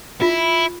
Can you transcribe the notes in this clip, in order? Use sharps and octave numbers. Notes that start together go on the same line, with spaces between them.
E4 F4